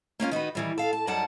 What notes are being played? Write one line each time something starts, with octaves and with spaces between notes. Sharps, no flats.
A#3 C#4 D#4 F4
D#3 D#4 F#4 B4
D#3 E3 G3
A4 F5
A5
F#2 G3 D#4 D5 F#5 A5